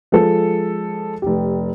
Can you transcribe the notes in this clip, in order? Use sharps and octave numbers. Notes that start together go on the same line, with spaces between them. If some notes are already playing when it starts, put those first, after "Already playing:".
F3 G#3 A4
F1 G4